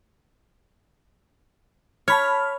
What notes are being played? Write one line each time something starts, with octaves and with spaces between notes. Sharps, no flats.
C#5 A5 B5 F6